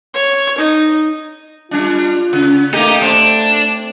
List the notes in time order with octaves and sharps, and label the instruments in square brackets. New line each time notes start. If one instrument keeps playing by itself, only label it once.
[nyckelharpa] C#5
D#4
[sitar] G3 D4 [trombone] F4
[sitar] C#3
[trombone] A3 [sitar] A#3 G4 [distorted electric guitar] D#4
[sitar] C4 [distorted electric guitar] D4